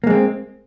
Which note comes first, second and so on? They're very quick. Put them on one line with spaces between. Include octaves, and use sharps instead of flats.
A#3 G#3 C4